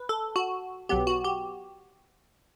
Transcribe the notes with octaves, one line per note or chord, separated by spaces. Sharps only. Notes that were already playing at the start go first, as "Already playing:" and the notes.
Already playing: B4
A4
F#4
B1 B2 F#3 B3 G4
F#4
G4